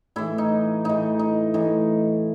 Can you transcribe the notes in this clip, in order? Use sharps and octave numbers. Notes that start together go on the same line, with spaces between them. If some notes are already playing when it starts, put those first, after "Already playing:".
A2 E3 E4
D#4
A2 E3 D#4
D#4
A2 E3 D#4